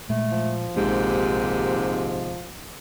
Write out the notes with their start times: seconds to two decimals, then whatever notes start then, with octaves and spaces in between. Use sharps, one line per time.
0.10 A#2 G#3 A3
0.32 F3
0.76 A#1 D#2 G#2 C3 G#3 C#4 G4